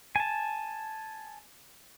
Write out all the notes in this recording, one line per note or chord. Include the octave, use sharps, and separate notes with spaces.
G#5 A5